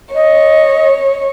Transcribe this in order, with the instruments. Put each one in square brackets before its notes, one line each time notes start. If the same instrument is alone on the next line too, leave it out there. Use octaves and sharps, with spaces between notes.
[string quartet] C#5 [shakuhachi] D#5